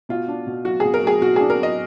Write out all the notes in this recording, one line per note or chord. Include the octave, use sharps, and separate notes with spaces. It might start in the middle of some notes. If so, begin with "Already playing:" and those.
B2 F4
D4
B2
F#3 F#4
B2 G#4
A#4
F#3 G#4
B2 F#4
D4 G#4
A#4
F#3 D#5